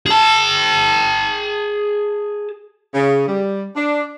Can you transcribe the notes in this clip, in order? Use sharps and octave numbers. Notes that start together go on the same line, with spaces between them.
G#4 A5
C#3
G3
D4